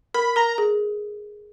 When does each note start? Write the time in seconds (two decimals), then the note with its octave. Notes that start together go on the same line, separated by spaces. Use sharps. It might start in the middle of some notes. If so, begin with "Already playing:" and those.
0.14 A#4 B5
0.36 A#4 A#5
0.58 G#4